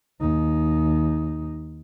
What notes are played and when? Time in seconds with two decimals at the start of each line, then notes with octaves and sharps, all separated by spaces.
0.20 D#2 D#4